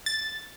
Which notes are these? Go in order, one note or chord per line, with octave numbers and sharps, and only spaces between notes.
A6